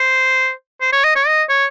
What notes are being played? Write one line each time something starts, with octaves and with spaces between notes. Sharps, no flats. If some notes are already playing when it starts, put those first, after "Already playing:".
Already playing: C5
C5
C#5
D#5
C#5
D#5
C#5